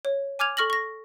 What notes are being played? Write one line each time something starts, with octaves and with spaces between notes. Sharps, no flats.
C#5
G#5 D6 F6 G#6 F7
A4 C#6 F6 A#6 F#7
C#6 A#6